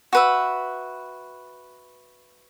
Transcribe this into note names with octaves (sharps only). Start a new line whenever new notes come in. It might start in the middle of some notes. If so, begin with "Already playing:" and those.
F#4 B4 E5